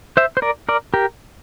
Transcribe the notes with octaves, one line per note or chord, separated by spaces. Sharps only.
C5 E5
C5
A#4 D5
A#4 D5
G4 A#4